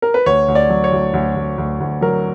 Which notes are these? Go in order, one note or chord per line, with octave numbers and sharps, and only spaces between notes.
A#4
B4
D2 C#5
D2
D5
F#3
C#5
D2
D2
D2
D2
D2
F#3 A#4